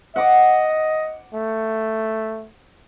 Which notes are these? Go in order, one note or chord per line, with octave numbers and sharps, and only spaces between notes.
D#5 F#5 D6
A3